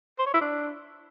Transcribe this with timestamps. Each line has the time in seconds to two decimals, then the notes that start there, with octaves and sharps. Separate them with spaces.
0.19 C5
0.26 C#5
0.34 E4
0.41 D4